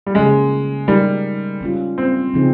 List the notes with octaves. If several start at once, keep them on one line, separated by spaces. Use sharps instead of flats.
G3
C#3 F3 G#3 A#3 C#4
G3 G#3 D#4 A#4
G3 C#4 F4
C4
C#3 F3 C4 D#4 G#4